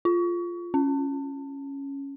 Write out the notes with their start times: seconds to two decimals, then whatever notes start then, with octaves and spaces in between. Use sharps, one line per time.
0.05 F4
0.74 C#4